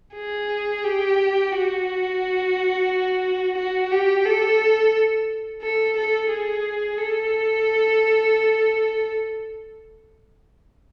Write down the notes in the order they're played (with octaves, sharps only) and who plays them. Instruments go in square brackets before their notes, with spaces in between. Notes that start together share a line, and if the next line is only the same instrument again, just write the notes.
[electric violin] G#4
G4
F#4
F#4
G4
A4
A4
A4
G#4
A4